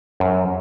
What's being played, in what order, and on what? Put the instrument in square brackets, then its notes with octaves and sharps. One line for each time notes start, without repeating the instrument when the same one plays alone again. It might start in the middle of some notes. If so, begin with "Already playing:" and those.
[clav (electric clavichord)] F#2